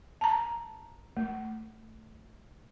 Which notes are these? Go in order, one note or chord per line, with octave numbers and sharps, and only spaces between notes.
A5 A#5
A3